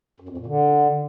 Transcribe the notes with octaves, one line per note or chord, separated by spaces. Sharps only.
F#2
F2
A#2
D3